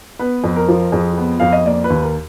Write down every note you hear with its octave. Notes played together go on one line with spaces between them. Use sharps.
B3 B4
F2
A#4
F3
F2 G#4
B3
F2 F5
D#5
A#3 D5
B4
D#2
A#4